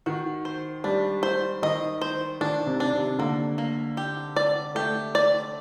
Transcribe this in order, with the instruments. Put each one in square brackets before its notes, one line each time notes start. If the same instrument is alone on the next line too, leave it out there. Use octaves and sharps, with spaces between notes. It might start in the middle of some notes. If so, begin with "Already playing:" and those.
[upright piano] D#3 [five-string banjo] F#4
[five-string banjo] C5
[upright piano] G3 [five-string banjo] D4
[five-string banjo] C5
[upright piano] D#3 [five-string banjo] D#5
[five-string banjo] C5
[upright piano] D#3 [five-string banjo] D4
[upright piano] C3
[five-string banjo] D4
[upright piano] C3
[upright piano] D3 [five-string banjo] A#3
[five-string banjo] A#3
G4
D5
[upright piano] A3 [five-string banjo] G4
[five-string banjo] D5